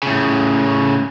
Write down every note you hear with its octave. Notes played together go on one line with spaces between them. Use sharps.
A2 C#3